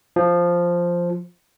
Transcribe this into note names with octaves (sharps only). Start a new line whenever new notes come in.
F3